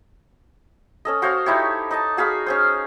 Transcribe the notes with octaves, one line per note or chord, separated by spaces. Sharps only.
C#4 A4 D#5
F#4 C5 C#5 F5
D#4 E4 G4 C#5
D#4 D#5 A5
F#4 G#4 F5 B5
C#4 G#4 C5